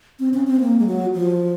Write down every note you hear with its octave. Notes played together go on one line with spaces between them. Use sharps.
C4
C#4
C4
A#3
G#3
F#3
F3